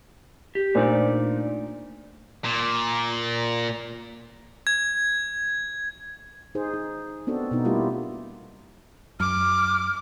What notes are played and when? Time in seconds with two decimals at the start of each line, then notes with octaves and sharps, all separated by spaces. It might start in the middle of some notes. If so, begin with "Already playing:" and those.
0.55 G4
0.75 A#2 A3 D4 D#4 C5 D5
2.45 A#2
4.67 G#6
6.55 D#4 G#4 C5
6.74 D#4
7.27 B3 C4 D4 F#4 A4
7.51 B2 B3 D#4
7.64 G3 A3 A#3 E4 F4 G4
9.20 F#2 D6 F6